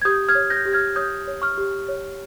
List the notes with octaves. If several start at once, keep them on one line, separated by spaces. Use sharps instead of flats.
G#6
G4 D#6 G6
F6 G#6
C#5
G6 A#6
G4
F6 G#6
C#5 D#6 G6
C#5
C#6 F6
G4
C#5